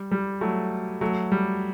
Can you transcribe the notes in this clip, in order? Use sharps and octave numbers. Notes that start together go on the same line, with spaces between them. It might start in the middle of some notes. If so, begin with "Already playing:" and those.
Already playing: G3
G3
F#3 A3
F#3 A3
G3